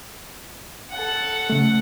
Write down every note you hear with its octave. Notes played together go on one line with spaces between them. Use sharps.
A4 F#5
C#3 A3